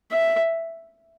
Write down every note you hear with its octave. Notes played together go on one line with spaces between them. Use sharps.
E5